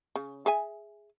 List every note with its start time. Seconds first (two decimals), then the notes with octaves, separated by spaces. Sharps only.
0.16 C#3
0.46 G#4 E5 G#5